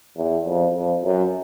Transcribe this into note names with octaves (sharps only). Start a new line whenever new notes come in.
E2
F2
F2
F#2